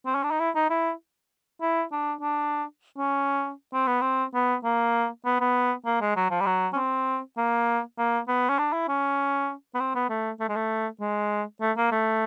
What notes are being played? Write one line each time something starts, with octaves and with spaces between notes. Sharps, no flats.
C4
C#4
D4
D#4
E4
D#4
E4
E4
D4
D4
C#4
C4
B3
C4
B3
A#3
B3
B3
A#3
G#3
F#3
F3
G3
F#3
C#4
C4
A#3
A#3
B3
C#4
D4
E4
C#4
B3
C4
B3
A3
A3
G#3
A3
G#3
A3
A#3
A3